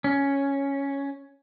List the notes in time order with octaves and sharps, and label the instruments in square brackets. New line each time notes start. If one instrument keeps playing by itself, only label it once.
[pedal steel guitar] C#4